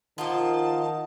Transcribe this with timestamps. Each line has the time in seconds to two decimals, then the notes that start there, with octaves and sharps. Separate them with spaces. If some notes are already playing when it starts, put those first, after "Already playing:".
0.18 D#3 F3 A#3 F4 D#5 F#5 A5 D#6